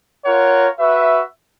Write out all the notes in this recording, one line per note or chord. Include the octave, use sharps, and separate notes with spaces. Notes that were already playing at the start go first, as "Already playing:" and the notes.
F4 A#4 C#5 F#5
F#4 B4 E5